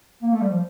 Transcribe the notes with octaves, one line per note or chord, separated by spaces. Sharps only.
A#3
A3
G3
F3